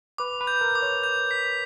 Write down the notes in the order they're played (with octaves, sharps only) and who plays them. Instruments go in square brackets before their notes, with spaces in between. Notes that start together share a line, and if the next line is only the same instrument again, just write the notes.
[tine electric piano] B4 [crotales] D6
[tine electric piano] B4
[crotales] G6
[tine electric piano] A#4
[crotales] D6
[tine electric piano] C#5
[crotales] G6
B6